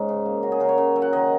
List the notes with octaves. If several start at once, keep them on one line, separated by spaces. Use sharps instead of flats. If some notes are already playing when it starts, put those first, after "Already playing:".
Already playing: G#2 C#4 D#4
C#3
A#3
C#3 F#4
G#4
C#3 A#4
C#5
C#3
F#3
F#5
D#3 D#5